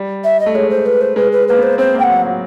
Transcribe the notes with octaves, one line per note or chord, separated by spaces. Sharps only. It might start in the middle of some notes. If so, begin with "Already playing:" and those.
Already playing: G3
E5
D#5
A3
G#3 C#5
C5
B4
C5
G#3 B4
B4
A#3 B4
B3 C5
C4 C5
A#3 G5
F#5
F#3
F#3